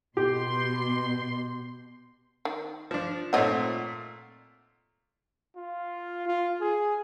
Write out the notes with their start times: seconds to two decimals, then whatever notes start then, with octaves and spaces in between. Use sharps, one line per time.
0.17 B2 G4 C6
2.45 D#3
2.91 F3 D4
3.33 A#2 A3 C4 C#5 D#5 F#5
5.56 F4
6.28 F4
6.61 G#4